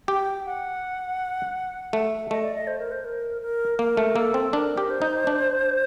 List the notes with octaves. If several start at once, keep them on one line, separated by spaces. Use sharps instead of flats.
G4 G5
F#5
A3
A3 D#5
D5
D#5
C5
A#4
C5
A#4
A#4
A#3 A#4
A3
A#3 A4
C4
D4 A#4
G4
C5
D#4
D4